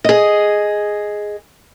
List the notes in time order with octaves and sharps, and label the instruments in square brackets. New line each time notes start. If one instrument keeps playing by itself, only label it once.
[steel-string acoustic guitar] G#4 D#5